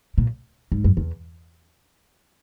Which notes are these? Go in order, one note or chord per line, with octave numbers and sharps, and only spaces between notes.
A#2
G#2
F#2
E2